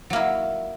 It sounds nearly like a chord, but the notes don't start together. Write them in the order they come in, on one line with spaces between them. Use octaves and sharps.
F#3 A#3 E4